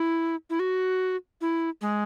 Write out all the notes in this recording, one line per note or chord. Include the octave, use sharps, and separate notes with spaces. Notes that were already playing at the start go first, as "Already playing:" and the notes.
Already playing: E4
E4
F#4
E4
G#3